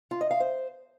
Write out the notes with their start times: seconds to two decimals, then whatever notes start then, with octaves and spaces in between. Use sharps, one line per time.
0.11 F4
0.21 D#5
0.31 F5
0.40 C5